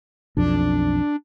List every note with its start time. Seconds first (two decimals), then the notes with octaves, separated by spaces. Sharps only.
0.37 B1 F2 D4